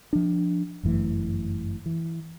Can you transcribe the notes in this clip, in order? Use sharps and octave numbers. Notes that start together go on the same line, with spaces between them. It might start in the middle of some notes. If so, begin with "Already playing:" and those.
F3 D4
G1 F#2 E3 A3
E3